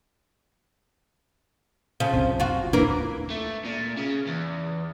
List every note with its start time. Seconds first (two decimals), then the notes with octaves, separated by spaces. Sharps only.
2.00 C#3 F3
2.13 F#1 C2 C3
2.40 F4 F#4
2.73 D#2 E3 A#3 D4 A#4
3.30 A3
3.65 A#2
3.97 C#3
4.27 E2